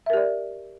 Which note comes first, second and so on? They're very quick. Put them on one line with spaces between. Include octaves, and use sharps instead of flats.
E5 A#4 G4 D5